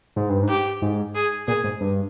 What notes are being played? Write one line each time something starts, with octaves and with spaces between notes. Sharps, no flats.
G#2
G2
G#2
G4
G#2
G#4
A#2 G#4
G#2
G2